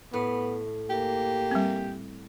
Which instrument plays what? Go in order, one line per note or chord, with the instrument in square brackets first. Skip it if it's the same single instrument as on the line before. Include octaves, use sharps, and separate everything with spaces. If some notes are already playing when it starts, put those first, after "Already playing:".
[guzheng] A2 [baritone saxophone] B3
[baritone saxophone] A#3 [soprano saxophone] G4
[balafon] G3 C4